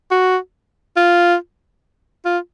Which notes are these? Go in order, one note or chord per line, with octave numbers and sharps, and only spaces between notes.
F#4
F4
F4